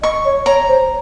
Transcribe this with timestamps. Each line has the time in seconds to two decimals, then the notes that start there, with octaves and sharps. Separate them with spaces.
0.02 D#5 C#6
0.25 C#5
0.46 C#5 A#5
0.68 C5